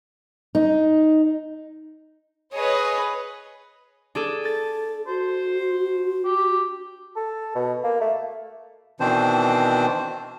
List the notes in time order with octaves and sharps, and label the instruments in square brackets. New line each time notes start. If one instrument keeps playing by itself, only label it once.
[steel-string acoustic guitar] D#4
[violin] G#4 B4 [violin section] C#5 D#5
[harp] D4 G#4 A4
[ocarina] A4 [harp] A6
[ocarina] F#4 [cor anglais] C5
[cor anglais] G4
[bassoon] A4
B2
A#3
A3
[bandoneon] B2 D#3 E3 C4 D4 C5